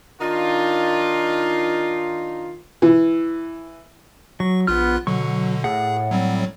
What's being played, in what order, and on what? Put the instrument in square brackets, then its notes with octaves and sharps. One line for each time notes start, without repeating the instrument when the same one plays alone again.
[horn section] D#3 D4 D#4 F4
[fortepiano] E3
[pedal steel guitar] F#3 [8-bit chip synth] C#6
[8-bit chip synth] A#1 F4 F#6 [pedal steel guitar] B3 F6
[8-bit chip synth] B2 D3 [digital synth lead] F#3 [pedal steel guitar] C#6
[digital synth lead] A2 [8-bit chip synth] G#4 [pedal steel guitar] F#5
[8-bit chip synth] F#3 G3 C4